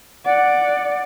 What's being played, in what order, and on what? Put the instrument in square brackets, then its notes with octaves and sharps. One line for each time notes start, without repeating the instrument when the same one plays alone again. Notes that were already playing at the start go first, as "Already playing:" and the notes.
[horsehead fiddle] D5 [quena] F#5